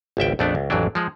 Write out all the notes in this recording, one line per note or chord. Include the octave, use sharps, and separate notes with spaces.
G#1 C#2 E5 G5
A#1 F2 A3 B3 D4
C#2
A1 F2 E3 F#3 D4
F3 G#3